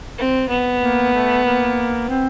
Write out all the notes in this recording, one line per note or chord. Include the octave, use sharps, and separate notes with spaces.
C4
B3
A#3
A3
A#3
C4